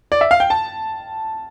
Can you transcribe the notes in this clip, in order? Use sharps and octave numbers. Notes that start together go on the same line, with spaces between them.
D5
E5
F5
G5
A5